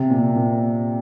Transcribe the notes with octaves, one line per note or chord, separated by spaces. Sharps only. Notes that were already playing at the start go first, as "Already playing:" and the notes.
Already playing: C3
A#2
A#2